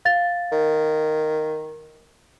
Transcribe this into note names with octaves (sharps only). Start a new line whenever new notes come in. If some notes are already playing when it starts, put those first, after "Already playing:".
F5 A6
D#3